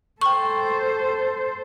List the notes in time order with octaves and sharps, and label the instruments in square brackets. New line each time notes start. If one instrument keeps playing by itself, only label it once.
[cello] A4 C5 [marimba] G5 C#6